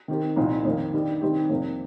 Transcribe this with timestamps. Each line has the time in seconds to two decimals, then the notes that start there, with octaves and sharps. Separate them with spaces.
0.08 D#3 C4 G4 A#4
0.36 C2 A#2 F3 D#4
0.65 F2 D#3 A#3 D#4
0.93 G2 D#3 G3
1.21 D#3 G3 C4 D#4 G4
1.49 F2 C3 G3 A#3